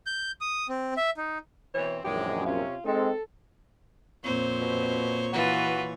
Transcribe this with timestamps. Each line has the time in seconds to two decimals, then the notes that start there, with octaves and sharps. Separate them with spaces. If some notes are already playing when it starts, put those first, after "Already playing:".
0.06 G6
0.41 D#6
0.69 C4
0.97 E5
1.17 D#4
1.74 B2 E3 C4 C#5
2.04 A#1 F#2 D#3 E3 G#3 G4
2.46 C3 C#4 F4
2.85 G#3 C4 D#4 A4
4.24 F2 A#2 C4 C5 C#5
4.60 B2
5.33 E3 F4 F#4 B4